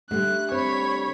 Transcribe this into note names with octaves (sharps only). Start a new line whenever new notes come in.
D3 G3 A3 F#6
C4 C5 C#5 B5